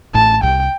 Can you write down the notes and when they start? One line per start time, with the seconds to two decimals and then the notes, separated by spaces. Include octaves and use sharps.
0.14 A1 A2 A5
0.43 C2 C3 G5